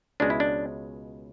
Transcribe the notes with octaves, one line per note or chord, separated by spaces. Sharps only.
C#2 B2 G#3 C#4 D4
E4
D4